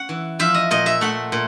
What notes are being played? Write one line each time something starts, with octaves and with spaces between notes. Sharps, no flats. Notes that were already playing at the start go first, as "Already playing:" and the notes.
Already playing: C#4 F#5
E3
F3 E5
D#5
A#2 D#5
E5
A3 F#5
A#2